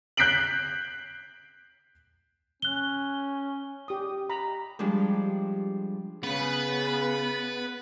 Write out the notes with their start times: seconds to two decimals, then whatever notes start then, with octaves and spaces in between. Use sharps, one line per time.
0.17 F#6 G6 B6 C7 D7 F#7
2.62 C#4 F#6 G7
3.88 G4 D#6
4.29 A#5 B5
4.79 F3 G3 G#3 D4
6.24 C#3 B3 B4 B5